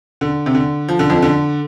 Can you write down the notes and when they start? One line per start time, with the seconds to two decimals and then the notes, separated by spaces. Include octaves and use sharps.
0.21 D3
0.46 C3
0.55 D3
0.88 F3
0.99 D3
1.10 F2 F3
1.23 D3